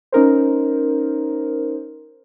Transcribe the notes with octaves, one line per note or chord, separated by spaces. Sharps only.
C#4 D#4 A#4 C5